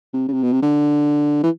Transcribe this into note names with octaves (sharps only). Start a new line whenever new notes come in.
C3
C#3
C3
B2
C3
D3
E3